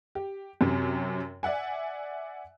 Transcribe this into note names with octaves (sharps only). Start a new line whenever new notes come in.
G4
F#2 C3 C#4
D5 E5 F#5 G#5